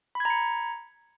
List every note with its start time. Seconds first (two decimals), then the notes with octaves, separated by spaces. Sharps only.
0.15 B5
0.20 G#6
0.25 A#5
0.30 C#7